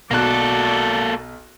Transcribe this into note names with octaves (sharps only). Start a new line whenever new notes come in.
B1 A#3 F#4 A4 D5 F#6